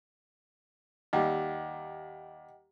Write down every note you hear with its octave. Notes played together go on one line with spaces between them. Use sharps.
D#2 G3 D#5 F#5 G5